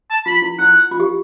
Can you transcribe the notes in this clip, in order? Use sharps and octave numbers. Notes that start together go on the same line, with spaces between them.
A5
F4 B5
E4
E4 F#5
F4
G4